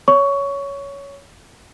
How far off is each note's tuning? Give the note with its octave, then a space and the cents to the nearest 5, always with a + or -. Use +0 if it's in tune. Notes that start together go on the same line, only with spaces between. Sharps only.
C#5 +10 C#6 +15